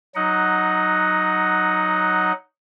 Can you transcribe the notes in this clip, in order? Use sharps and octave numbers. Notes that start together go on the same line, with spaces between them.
F#3 D#4 D#5 F#5